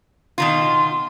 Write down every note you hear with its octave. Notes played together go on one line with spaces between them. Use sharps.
B2 D#3 F4 C6